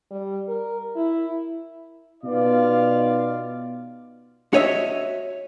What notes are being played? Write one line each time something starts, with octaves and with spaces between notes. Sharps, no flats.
G3
A#4
E4
B2 B3 D#4 F4 D5 F5
F#4 C#5 D#5 E5